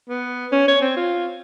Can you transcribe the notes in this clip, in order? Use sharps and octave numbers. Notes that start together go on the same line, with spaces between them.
B3
C#4
C#5
C4
F4